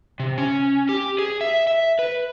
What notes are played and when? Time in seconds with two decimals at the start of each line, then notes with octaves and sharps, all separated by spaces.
0.20 C3
0.38 C#4
0.89 G4
1.19 G#4
1.41 E5
1.67 E5
1.99 B4